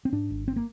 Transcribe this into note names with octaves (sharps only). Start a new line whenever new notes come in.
C4
G#2 D4
G#1
C4
A#3